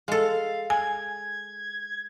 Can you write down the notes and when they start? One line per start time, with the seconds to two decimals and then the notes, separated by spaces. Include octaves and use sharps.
0.08 G#3 A4 F5
0.70 G#5 G#6